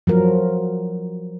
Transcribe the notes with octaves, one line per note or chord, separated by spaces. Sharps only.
F3 F#3 A#4